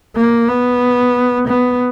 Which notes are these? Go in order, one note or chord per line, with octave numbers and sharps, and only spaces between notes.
A#3
B3
B3